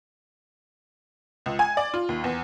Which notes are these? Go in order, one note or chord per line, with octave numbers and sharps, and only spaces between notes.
C#2
G#5
D5
F4
D#2
E2